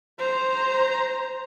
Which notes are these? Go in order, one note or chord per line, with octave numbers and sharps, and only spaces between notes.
C5 A#5